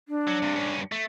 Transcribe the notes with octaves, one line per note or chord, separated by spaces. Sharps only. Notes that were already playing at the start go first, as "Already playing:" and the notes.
D4
F#3
G2 C3
G2 C#4
A3